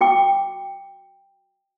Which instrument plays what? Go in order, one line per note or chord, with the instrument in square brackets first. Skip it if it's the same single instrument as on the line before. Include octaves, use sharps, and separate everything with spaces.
[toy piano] F#4 G5 D6